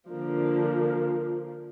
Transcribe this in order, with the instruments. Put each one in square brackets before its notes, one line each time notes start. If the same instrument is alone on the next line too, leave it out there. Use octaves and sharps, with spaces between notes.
[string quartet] D3 F3 A#3 D4